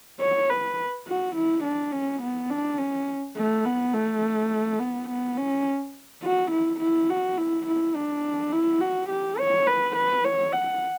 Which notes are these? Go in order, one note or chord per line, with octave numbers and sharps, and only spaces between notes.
C#5
B4
F#4
E4
D4
C#4
B3
D4
C#4
A3
B3
A3
B3
B3
C#4
F#4
E4
E4
F#4
E4
E4
D4
E4
F#4
G4
C#5
B4
B4
C#5
F#5